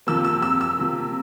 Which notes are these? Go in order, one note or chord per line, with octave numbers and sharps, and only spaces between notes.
C3 F3 A#3 E6
E6
E6
E6
C3 F3 A#3